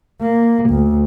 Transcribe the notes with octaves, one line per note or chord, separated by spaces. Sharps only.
A#3
D2